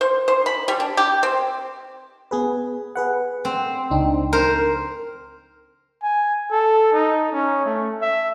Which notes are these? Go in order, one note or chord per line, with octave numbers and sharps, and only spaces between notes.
C5
C5
B5
G3
D4
G4
C4
B3 G#4 B4
G#4 B4 F#5
C4
C#2 D4 D#4
A#4 C5
G#5
A4
D#4
C#4
A3
E5